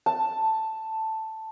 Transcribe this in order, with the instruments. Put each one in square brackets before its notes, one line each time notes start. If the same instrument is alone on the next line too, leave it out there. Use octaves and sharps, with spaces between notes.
[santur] A5